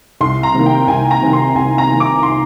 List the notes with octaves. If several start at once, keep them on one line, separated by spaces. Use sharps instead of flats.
C2 C6
A#5
C3 D#3 A#3
G5
C2 G#5
A#5
C3 D#3 A#3
C6
C2 G#5
A#5
C3 D#3 A#3
D6
C6